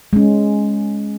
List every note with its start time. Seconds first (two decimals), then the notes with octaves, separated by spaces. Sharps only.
0.13 G#3 C#4